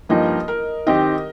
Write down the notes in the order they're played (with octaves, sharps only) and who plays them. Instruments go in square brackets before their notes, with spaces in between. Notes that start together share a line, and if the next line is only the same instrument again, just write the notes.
[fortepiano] G2 F3 A#3 D#4 [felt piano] D#5
[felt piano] A#4
[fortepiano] D#3 C4 G4 [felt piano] D#5